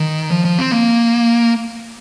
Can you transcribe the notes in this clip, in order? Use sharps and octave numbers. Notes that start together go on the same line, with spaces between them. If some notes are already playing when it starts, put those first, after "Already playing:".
Already playing: D#3
F3
F3
C4
A#3